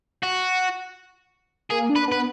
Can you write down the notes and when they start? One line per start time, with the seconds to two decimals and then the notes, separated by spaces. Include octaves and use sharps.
0.23 F#4
1.71 A#3 G#4
1.90 D4
1.96 B4
2.08 B3 B4